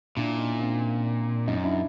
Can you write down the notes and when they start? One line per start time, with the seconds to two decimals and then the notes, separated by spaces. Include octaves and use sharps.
0.17 A#2 D4 E4
0.38 C#4 D#4
0.60 C4 D4
1.47 F#2 C#4 D#4
1.64 D4 E4